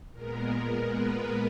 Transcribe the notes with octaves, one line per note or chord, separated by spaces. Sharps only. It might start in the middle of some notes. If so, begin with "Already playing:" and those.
A#2 G#3 B3 A#4
B4